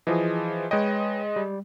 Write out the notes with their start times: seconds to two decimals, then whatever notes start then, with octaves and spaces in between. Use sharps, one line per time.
0.07 E3 F3 G#4 D#5
0.71 G#3 B4 C#5 D#5 G5
1.36 G3